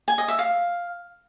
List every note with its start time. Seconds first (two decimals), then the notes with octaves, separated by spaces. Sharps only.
0.08 G#5
0.18 D#5
0.28 E5
0.39 F5